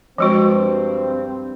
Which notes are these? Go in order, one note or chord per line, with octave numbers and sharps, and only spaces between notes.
G2 F3 G#3 C4 F#4